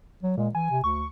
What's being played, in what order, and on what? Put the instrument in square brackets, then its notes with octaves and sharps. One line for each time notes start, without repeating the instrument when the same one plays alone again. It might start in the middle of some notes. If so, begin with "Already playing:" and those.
[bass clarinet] F#3
[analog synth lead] A#2 [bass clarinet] G#3
[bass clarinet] E3 [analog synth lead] G#5
[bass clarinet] C3
[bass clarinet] D2 [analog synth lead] C#6